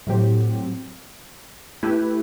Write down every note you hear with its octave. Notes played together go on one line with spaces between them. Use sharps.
A2 F#3 C4 G4
A3 E4 G4 B4